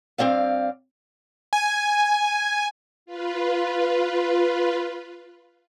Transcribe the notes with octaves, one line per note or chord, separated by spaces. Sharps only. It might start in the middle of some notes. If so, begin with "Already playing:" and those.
G2 F#3 C4 D5 F5
G#5
F4 B4